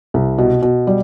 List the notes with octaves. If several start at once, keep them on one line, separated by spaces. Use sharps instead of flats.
C2
B2
B2
G3